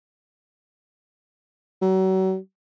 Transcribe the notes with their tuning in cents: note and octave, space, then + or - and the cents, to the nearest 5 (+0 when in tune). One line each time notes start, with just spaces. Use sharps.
F#3 +35